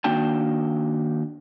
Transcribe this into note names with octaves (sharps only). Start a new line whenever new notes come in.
D#3 A#3 D4 F#4 G5 A5